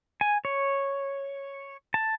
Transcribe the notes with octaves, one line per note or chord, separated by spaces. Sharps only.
G#5
C#5
A5